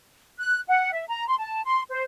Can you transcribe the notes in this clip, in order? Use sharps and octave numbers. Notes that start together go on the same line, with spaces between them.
F#6
F#5
E5
A#5
C6
A5
C6
C5